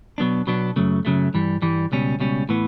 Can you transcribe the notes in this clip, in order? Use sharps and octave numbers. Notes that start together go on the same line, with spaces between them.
B2 F#3 B3 D4
B2 F#3 B3 D4
F#2 C#3 F#3 A3
F#2 C#3 F#3 A3
G2 E3 G3
G2 E3 G3
C#2 B2 G3 C#4
C#2 B2 G3 C#4
A2 E3 B3